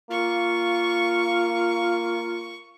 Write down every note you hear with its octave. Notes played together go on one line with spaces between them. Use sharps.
A#3 F4 C#6